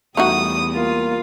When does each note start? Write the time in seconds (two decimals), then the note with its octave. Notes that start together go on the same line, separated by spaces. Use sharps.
0.17 E2 G3 A3 D#4 F#4 D#6
0.75 A#3 F4